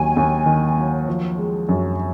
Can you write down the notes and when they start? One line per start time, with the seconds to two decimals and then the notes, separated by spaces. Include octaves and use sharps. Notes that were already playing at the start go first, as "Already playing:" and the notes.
Already playing: D#2 D#3 F#3 G#5
0.17 D#2
0.46 D#3
0.77 F#3
1.08 F3
1.38 G#3
1.69 F#2